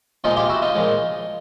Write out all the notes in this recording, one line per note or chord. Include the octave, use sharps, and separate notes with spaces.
A#2 F3 G#3 D#4 F4
F4 G4
E4 F#4
D#4 F4
A#2 F3 G#3